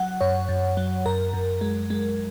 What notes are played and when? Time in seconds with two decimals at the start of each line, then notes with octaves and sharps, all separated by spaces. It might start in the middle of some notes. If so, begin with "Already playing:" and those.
Already playing: F#3 F#5
0.21 F#2 C#5
0.49 F#2
0.77 F#3
1.06 F#2 A#4
1.33 F#2
1.61 G#3
1.90 G#3